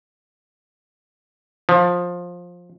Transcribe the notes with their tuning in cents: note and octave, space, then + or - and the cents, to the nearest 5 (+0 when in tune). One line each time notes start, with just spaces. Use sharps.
F3 +15